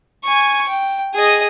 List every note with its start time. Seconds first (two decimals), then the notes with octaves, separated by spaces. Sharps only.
0.24 G#5 C#6
0.68 G5
1.15 G#4 D#5